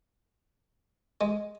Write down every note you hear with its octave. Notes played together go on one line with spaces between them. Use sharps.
G#3